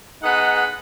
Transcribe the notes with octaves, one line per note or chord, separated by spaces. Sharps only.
B3 D#4 G#4 D#5 F#5